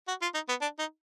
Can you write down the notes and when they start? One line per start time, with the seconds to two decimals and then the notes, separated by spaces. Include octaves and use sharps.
0.08 F#4
0.22 F4
0.34 D#4
0.49 B3
0.61 D4
0.79 D#4